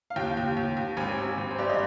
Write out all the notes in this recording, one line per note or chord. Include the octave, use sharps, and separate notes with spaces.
F5
D#2 G5
D#2
D#2
D#2
G#1 G#5
G#1
G#1
C5
G2 D5
D#5